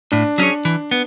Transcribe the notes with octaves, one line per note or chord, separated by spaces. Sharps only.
A2 D4
F#3 C#4 G#4 C#5
E3
B3